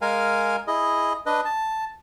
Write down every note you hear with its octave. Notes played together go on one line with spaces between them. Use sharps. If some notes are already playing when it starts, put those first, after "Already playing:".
G#3 A#4 F5 G#5
E4 G#4 D#5
D4 B4 D#5
A5